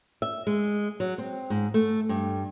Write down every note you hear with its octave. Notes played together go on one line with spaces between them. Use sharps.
E5
G#3
F#3
C4
G#2
A3
G2